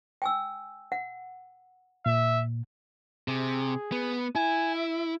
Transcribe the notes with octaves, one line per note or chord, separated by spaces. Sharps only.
G5 G#5 E6
F#5
A#2 E5
C3 G#4
B3
E4 G#5
E5